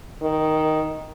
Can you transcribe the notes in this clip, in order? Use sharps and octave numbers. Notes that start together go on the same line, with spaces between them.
D#3